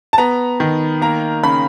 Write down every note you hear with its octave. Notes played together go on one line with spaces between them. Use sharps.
A5
B3 A#5
D#3
A#3 A#5
C#3 B5